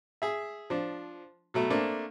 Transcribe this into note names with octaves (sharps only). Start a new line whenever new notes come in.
G#4 E5
F3 D4
B2 F#3 A3
A3 A#3 C4 D4